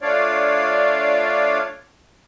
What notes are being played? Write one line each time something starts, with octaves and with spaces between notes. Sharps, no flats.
A3 D4 F4 C#5 D5 F5